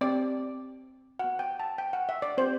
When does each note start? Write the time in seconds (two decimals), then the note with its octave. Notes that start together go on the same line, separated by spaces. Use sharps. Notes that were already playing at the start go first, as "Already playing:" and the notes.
0.01 C4 G4 D5
1.19 B3 F#4 F#5
1.39 G5
1.60 A5
1.78 G5
1.93 F#5
2.09 E5
2.22 D5
2.37 C4 G4 C5